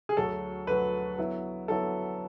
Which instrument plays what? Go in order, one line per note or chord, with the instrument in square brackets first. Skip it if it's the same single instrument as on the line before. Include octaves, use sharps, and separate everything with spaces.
[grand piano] G#4
[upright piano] D2 D3 F#3 [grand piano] A4
[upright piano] D2 D3 F#3 [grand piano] B4
[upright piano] D3 F#3 B3 E4
[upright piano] D3 F#3 B3 E4 [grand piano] A4